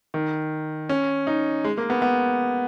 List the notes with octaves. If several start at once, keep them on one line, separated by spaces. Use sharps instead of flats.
D#3
C#4
D#4
G#3
A#3
B3
B3